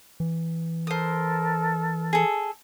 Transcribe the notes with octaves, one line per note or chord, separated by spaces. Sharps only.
E3
A4 A#4 C5 D#6
G#4 A4